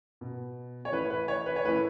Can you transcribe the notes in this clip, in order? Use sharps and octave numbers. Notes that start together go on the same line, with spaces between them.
B2
C#5
A2 E3 B4
B4
C#5
B4
C#5
A2 E3 B4